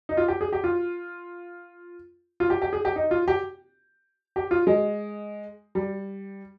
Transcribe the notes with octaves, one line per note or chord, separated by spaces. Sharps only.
D#4
F4
G4
G#4
G4
F4
F4
G4
G4
G#4
G4
D#4
F4
G4
G4
F4
G#3
G3